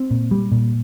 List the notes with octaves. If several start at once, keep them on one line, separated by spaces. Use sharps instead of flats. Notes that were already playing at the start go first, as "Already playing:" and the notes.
Already playing: C4
A#2
G3
A#2